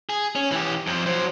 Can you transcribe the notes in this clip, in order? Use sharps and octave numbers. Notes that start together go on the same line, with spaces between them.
G#4
C#4
E3 G4
F2 F3
F#3 C5